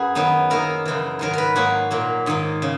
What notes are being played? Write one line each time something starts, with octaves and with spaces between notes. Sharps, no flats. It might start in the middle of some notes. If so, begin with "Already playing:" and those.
Already playing: F#2 F#4 G#4 B4
D#3 F#3 B3 D#4
D#3 A#3 E4 A#4
F#2 C#3 E3
G#2 D#3 F#3 A#4
A#4 B4
G#2 F#3 A#3 D#4 F#4
A#2 F#3 A#3
G#2 D#3 A#3
C#3